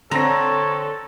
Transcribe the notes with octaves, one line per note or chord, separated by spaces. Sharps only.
D3 C4 A4 C#5 A#5 A#6